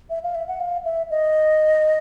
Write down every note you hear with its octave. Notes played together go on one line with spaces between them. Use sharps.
E5
F5
E5
F#5
F5
E5
D#5